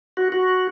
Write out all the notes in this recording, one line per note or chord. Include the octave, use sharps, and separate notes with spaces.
F#4
F#4